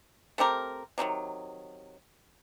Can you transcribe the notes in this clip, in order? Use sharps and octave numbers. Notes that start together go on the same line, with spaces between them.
A3 C4 G4 A#4
C3 D#3 E3 F#3